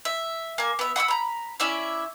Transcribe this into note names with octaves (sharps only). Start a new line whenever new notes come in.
E5
A#3 G#5
B3 E5
F#5 B5 C#6 E6
A#5 B5
C#4 E4 D5 E5